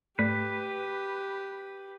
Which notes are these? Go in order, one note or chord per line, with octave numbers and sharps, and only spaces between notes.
G#2 A3 G4 B4 D5